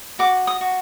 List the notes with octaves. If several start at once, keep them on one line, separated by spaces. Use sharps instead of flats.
F#4 D6
D#6
F#4